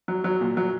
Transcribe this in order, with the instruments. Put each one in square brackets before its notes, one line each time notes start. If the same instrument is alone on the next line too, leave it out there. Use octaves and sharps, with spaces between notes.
[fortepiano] F#3
F#3
A#2
F#3